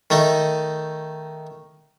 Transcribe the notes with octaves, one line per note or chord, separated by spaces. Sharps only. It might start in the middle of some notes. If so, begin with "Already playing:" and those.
D#3 A3 D#4